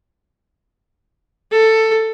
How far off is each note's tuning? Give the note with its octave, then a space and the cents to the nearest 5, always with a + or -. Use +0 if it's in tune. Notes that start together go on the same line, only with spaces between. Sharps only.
A4 +10